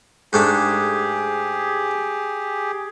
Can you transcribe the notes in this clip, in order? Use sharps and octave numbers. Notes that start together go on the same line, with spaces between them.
G#2 A3 D4 G4 G#4